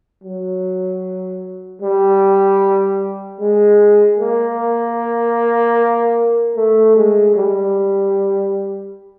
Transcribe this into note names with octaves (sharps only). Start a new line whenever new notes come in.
F#3
G3
G#3
A#3
A3
G#3
G3